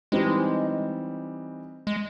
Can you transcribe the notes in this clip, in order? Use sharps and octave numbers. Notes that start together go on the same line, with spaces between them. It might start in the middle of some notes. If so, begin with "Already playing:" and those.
E3 G3 G#3 C4 D#4 G4
G#3